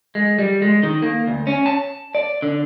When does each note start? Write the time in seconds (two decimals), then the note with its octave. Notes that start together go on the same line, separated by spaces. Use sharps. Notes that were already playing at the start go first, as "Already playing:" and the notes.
0.15 G#3
0.39 G3
0.62 G#3
0.83 D#3
1.02 A#3
1.27 D2
1.47 C#4
1.66 A5
2.15 D5
2.42 D3